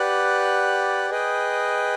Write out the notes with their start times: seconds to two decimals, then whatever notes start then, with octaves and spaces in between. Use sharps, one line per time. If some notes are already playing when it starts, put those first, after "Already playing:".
Already playing: G4 B4 D5 F#5
1.10 G#4 B4 D#5 G5